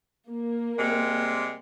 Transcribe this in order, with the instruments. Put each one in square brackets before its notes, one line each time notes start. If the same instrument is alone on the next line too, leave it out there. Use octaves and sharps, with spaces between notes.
[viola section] A#3
[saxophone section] C3 G3 G#3